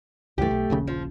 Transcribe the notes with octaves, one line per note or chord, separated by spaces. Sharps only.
C#2 G2 E3 A3 G4
B1
D#1 A#1 C#3
F3